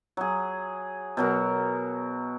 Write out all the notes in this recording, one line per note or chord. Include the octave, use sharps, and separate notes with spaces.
F#3 G#4
B2 F#3 A#4